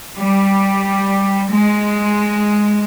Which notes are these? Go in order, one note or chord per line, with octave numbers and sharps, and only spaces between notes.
G3
G#3